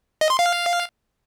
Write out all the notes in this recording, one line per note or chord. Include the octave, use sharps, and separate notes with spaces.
D#5
C6
F5